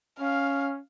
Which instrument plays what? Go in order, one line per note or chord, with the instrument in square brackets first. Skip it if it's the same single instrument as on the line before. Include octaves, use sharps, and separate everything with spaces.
[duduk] C#4 [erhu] F5